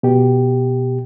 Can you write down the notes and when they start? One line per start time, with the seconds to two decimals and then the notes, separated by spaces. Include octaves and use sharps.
0.03 B2 G4